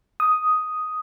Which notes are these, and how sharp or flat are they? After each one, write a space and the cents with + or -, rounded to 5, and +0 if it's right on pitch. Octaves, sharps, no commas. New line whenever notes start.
D#6 +5